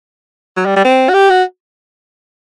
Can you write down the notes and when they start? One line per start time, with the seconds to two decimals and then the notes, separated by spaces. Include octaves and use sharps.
0.57 F#3
0.66 G3
0.76 G3
0.85 C4
1.09 F#4
1.14 G4
1.30 F#4